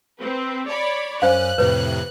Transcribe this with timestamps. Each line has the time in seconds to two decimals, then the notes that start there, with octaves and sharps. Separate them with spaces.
0.19 C4 B4
0.66 C#5 D5 B5
1.22 F#2 C#4 C5 F5 F#6
1.58 F2 A2 C3 B4 C#5